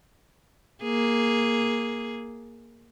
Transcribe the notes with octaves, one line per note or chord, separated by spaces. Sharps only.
A#3 G#4